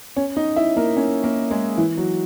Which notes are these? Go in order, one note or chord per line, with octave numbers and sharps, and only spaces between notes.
C#4 C#5
D#4 D#5
E4 E5
A#3 A#4
C#4 C#5
A#3 A#4
G#3 G#4
E3 E4
F#3 F#4